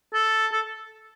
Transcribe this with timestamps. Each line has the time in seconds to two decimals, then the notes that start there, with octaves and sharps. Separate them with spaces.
0.14 A4
0.52 A4